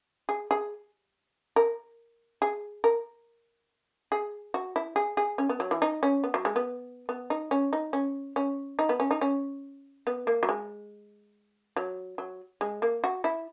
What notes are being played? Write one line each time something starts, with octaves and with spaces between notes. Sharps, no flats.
G#4
G#4
A#4
G#4
A#4
G#4
F#4
E4
G#4
G#4
C#4
B3
F#3
E3
D#4
C#4
B3
F#3
G#3
B3
B3
D#4
C#4
D#4
C#4
C#4
D#4
B3
C#4
D#4
C#4
B3
A#3
F#3
G#3
F#3
F#3
G#3
A#3
F#4
E4